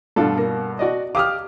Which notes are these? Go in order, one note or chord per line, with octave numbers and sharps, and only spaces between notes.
G2 B2 D4 F4 A4
A#3
F#4 D5 D#5
G4 F5 D6 D#6 F6